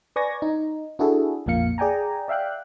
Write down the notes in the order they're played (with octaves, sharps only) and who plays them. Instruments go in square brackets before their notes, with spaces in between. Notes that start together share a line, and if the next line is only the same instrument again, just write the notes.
[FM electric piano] B4 D5 G#5 C#6 G#6 A#6
D#4
D4 E4 F#4 G#4 A4
A#1 F2 A#2 A#3 F5 C#7
G#4 D5 G5 G#5 A#5
D5 E5 F5 G5 F#6